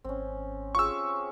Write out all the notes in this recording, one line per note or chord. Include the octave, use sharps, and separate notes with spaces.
G#1 C4 C#4
F4 G4 G#4 C#6 E6